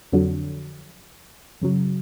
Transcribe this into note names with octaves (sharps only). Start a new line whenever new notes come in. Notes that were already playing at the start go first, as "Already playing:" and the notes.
F2 D3 F#3
F#2 C#3 F#3